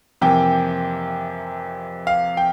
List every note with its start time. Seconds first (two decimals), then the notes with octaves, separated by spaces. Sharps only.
0.21 F2 C3 E3 A#3 G5
2.07 F5
2.37 G5